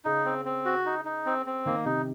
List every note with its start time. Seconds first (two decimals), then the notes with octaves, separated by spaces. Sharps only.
0.05 C#3 D#4
0.25 C4
0.45 C4
0.65 F#4
0.86 D#4
1.05 D#4
1.26 C4
1.46 C4
1.66 D#3 A#3
1.86 C3 D#4